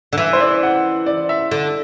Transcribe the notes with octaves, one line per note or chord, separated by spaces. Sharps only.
D3
E3 E5
C5
D5
F#5
D5
E5
D3